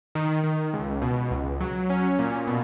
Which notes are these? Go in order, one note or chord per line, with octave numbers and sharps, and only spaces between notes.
D#3
D#3
C#2
B2
C#2
F#3
C#4
A#2
B2